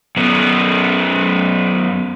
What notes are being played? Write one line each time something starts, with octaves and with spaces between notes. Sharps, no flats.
F#2 B3